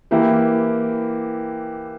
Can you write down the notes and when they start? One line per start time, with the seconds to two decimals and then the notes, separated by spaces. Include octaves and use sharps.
0.11 E3 A#3 E4 G4